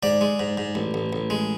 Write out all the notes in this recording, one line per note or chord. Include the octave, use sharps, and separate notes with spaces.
G#2 D5
G#3
G#2
G#2
A1
A1
A1
G#3